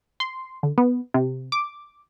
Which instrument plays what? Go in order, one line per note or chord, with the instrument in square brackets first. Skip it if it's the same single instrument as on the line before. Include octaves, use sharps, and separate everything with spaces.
[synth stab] C6
D3
B3
C3
D6